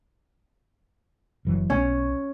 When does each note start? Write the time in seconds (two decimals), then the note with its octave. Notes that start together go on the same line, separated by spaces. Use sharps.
1.45 F#1 E3 F#3
1.70 B1 C#4